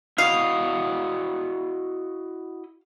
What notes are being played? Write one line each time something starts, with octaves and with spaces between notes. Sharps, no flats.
E4 F#4 D#5 F5